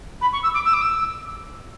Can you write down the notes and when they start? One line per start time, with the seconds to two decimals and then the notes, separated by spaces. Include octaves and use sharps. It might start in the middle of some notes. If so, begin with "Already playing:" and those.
0.21 B5
0.32 C#6
0.42 E6
0.54 D6
0.64 E6
0.73 D6
0.81 E6